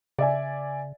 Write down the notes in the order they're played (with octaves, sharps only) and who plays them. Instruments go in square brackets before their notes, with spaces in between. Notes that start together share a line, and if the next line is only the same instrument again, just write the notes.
[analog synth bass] C#3 [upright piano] D5 E5 G#5